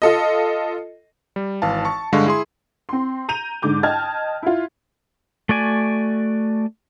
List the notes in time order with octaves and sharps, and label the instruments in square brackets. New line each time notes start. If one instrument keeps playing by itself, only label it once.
[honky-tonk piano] F4 A4 D#5
[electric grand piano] G3
G#1 E3 F5 A5
A5 C#6
G2 D3 G#3 F5 C#6
E4 G#4 C6
[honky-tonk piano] C4 C6
A#5 G6 D#7 F7
G#2 D3 D6 G6
D#5 G5 A5 F6 G#6
E4 F4
[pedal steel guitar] A3 F#4 D5 G#5